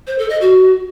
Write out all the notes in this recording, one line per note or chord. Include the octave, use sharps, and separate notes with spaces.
C5
A4
D#5
F#4